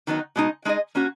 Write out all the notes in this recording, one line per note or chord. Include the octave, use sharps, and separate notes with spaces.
D#3 F#3 B3 D#4
B2 G#3 D#4
G#3 D#4 G#4 D#5
A#3 C#4 F#4